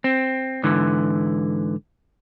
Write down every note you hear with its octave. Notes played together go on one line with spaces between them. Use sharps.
C4
G#2 D3 E3